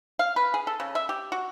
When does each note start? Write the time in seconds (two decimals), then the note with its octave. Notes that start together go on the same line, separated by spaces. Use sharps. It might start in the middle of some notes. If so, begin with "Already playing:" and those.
0.19 F5
0.36 B4
0.54 G#4
0.67 A4
0.80 C#3
0.95 E5
1.09 G4
1.32 F#4